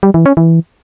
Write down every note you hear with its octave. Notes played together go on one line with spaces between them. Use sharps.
G3
E3
C#4
E3